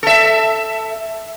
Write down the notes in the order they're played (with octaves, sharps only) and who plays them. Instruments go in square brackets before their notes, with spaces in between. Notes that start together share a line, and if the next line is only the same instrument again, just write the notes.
[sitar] A4 E5